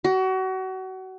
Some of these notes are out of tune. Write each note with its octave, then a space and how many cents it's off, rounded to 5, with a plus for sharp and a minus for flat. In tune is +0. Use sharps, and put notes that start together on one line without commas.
F#4 +30